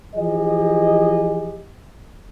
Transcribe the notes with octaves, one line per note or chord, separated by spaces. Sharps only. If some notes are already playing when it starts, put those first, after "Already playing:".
E3 F3 G4 G#4 D#5